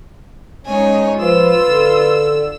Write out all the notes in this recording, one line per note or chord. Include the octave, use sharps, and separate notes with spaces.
G#3 C#4 D#4 C#5 G#5
F3 F4 B4 E6
D3